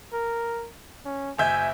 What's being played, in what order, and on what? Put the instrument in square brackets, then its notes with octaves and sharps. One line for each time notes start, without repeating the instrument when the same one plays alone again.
[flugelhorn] A#4
C#4
[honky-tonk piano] F#1 E5 G6 [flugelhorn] G#5